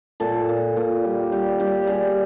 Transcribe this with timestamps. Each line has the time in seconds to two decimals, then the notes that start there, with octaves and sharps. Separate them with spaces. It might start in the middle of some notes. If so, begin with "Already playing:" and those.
0.20 A#2 A4
0.49 A#2
0.77 A#2
1.04 G3
1.32 G3 G4
1.60 G3 G4
1.87 G3 G#4